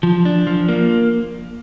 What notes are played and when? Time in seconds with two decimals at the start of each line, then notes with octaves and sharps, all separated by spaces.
0.03 F3
0.25 D4
0.47 F3
0.69 A#3